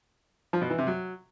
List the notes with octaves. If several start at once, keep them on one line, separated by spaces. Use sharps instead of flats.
F3
B2
E3
C3
F#3